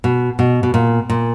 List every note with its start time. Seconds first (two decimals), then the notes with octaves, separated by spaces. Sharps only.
0.04 B2
0.39 B2
0.63 B2
0.74 A#2
1.10 A#2